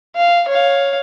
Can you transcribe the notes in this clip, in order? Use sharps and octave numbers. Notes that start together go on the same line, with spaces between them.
F5
C#5 F5